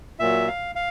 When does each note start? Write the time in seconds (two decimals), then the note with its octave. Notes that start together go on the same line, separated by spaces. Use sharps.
0.19 A#2 F#3 E5
0.48 F5
0.75 F5